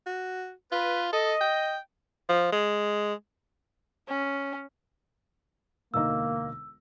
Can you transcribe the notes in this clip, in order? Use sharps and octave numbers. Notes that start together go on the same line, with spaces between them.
F#4
F4 B4
A4 D#5
G5
F3
G#3
C#4
E1 D2 A#3 D#4 E6